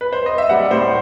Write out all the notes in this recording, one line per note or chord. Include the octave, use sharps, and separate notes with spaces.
B4
C5
D#5
E5
G3 F#5
A2 C5